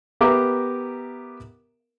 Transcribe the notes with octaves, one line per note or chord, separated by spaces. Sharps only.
B3 G4 A#4 E5 A#5 D6